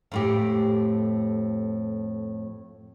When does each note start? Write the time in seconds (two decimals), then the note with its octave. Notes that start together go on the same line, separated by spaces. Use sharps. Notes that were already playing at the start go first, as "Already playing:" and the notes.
0.12 F2 A2 G4